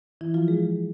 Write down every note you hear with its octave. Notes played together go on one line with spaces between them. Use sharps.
E3 E4
F3 F4
G#3 G#4